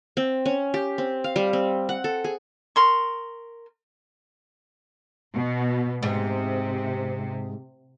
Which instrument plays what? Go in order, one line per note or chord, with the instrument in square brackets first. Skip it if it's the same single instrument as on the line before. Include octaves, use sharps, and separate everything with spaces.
[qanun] C4
C#4
G4
C4
F5
G3
C4
F#5
A4
G#4
[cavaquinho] A#4 C6 C#6
[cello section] B2
[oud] G#2 [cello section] C3